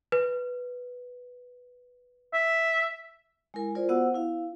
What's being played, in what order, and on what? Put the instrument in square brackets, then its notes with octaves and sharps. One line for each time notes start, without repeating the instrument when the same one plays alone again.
[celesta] B4
[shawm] E5
[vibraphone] G#3 E4 A#4 G#5
F4 A#4 C5 D5
B3 F#4 C5 F#5 E6
E4 F5